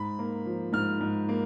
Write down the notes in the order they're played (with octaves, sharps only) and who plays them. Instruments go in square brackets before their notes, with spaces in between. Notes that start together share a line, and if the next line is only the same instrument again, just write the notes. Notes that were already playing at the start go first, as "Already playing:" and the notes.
Already playing: [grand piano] G#2 B5
A#3
F3
G#2 F6
G#2
A#3